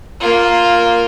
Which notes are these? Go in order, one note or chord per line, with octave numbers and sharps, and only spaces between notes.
A#3 F4